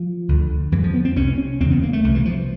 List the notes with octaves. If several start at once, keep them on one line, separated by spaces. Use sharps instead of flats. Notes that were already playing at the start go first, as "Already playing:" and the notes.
Already playing: F3
D2 D3
F2 D3 E3
F3
B3
C4
C2 C3 C#4
C#4
E2 C#3 C4
B3
A#3
A3
C2 B2 A3
E3
F3